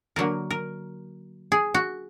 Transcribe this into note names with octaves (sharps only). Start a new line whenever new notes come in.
D3 F#3 A#3 A#4
A#4
G#4
F#4